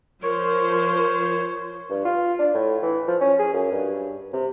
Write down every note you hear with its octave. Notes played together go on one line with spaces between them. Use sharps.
F3 A#4 C5 C#5
G2
F4
D4
A2
E3
F3
C#4
G#4
F#2
G2
C3